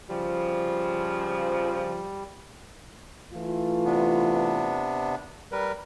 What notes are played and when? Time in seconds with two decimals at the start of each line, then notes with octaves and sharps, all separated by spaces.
0.09 C#3 F3 G3
3.33 E3 A3 F4
3.85 C3 B3 D4
5.52 G3 A#4 B4